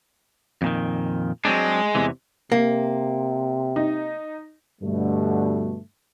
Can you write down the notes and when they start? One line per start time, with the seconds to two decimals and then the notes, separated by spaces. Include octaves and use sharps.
0.62 F2 A#2 D#3
1.45 F#3 G#3 C4 D4
1.95 E2 C3 E3
2.52 C3 A#3
3.76 D#4
4.82 G2 B2 D3 A3